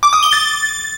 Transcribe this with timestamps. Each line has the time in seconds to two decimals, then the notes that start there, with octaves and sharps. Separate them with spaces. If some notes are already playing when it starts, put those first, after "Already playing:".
0.03 D6
0.13 D#6
0.23 G7
0.33 A6